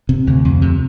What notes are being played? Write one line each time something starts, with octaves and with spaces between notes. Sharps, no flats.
C3
D2
F2
C3